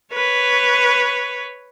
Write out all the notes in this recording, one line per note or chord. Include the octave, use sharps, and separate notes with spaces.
B4 C#5